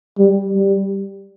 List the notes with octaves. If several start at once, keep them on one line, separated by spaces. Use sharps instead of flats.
G3
G3